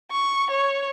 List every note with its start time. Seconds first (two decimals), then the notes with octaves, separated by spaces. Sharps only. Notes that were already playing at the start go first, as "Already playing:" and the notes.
0.11 C#6
0.51 C#5